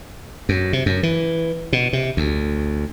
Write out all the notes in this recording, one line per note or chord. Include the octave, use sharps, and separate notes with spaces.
F#2
C3
F#2
E3
B2
C3
D2